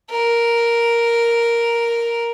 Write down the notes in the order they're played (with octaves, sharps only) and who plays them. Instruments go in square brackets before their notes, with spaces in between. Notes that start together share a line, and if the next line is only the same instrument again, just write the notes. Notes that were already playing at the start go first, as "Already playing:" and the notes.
[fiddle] A#4